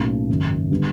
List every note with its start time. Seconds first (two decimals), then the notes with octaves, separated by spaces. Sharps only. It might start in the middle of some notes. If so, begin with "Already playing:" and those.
Already playing: B1 A2 F#3 A#3 C#4
0.29 G#1 F#2 C#3
0.71 D3 G3 B3